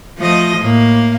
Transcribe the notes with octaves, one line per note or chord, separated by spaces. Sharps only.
F3 A3 D#5
A2 A#3